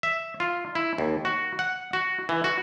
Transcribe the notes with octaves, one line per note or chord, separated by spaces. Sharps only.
E5
F4
E4
D#2
F#4
F#5
F#4
E3
F#4